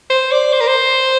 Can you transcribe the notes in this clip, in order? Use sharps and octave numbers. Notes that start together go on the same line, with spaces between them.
C5
D5
C5
A#4
C5